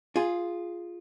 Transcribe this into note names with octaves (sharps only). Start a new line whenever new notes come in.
F4 G#4